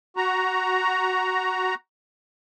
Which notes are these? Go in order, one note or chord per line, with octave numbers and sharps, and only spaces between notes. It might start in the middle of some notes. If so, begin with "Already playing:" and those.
F#4 A#5